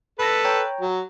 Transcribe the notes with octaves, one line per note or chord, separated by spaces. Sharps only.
A4 B4 B5 A#6
C#5 G5 A#5
F#3